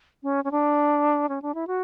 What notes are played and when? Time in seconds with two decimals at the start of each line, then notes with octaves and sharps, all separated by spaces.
0.23 C#4
0.44 C#4
0.51 D4
1.29 C#4
1.42 D4
1.55 E4
1.67 F#4